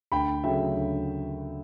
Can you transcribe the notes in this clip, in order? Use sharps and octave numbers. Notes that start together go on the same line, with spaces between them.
D2 G5 B5
C#3 F#3 A3 E5 G5
D2